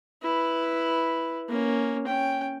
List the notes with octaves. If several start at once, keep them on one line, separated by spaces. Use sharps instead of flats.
E4 B4
A#3 C#4
C#4 G5